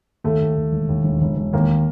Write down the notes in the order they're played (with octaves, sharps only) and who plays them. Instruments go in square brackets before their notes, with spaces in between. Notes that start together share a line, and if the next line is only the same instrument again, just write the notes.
[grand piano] D#2 [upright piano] A3
[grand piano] D#2
D#2
E1
D#2
E1
E1
E1
[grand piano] D#2 [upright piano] A#3